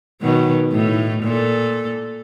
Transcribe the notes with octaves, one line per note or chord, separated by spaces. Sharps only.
B2 D#3 F#3
A2 D#4
A#2 A4